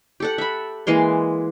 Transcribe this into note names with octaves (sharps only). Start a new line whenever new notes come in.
G4 A4 F#5
E5 B5
E3 G#3 A#3 C6